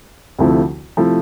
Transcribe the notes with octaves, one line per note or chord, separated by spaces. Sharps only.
D2 C3 F3 A3 E4
C3 F3 A3 E4